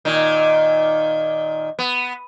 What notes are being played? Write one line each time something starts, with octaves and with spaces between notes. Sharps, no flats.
A#2 D#3
B3